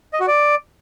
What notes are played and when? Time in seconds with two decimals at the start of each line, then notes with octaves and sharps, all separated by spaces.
0.13 D#5
0.20 F#4
0.27 D5